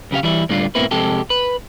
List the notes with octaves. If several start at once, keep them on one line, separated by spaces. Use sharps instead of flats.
B1 C#3 G4 F5
E3 G3 E4
A2 D3 G3 D4 F4
G#2 B2 A#3 C4 E4 B4
F2 C3 G#3 G4 A4
B4